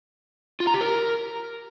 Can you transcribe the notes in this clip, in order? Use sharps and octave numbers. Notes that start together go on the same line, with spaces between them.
F4
A#5
G4
A#4